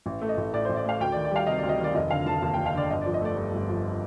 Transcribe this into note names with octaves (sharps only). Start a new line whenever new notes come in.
A1
A3
D#5
A1
A2 D5
A1 C5
D5
A3 F5
D2 G5
D#3 D5
D5
G3 F5
C3 D#5
D2 D5
D#5
D#3 D5
F1 D#5
D3 F5
F1 A5
D#2 A5
F1 G5
F5
D3 D5
G1 D#5
F3 D5
D#5
A3 D5
G2
G1
F3